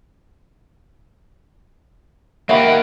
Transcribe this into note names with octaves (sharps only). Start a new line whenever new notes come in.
A#3 G4 E5 F#5 B5